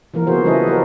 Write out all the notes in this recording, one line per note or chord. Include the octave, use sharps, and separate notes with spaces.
E3 F3 A#3 A#4
C#3 F3 B3 F#4 G#4 C5
G3 C#4 E4 A4 B4 D#5
F3 F#4 A#4 C5